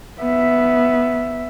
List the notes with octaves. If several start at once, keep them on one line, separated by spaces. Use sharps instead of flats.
B3 E5